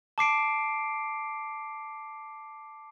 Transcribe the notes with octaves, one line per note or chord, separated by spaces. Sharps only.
A5 D6 C7 D7